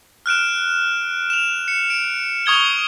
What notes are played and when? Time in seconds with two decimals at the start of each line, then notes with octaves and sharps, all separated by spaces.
0.26 F6 F#6 D7 E7
1.30 E7 F7
1.68 C#7
1.90 D7
2.46 C#6 D#6 G#6 G7